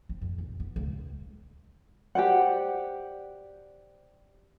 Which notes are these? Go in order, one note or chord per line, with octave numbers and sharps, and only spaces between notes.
C4
F2
E2
B3
C#2
G4 C5 D5 F#5